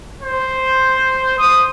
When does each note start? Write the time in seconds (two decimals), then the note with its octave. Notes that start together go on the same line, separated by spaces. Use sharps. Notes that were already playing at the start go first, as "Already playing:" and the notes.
0.22 C5
1.38 D#6